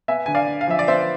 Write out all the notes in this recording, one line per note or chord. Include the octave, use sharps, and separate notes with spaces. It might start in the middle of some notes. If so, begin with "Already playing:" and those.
B3 E5 G#5
D3 G#5
D5 F5
D3
F5
F3 E5
D5
B3 C5 E5